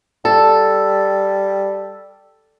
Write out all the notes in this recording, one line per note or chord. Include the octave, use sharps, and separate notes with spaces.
G3 A4